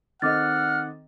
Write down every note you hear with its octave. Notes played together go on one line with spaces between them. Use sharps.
D#3 C4 A4 D#5 F#5 D6 F6 A6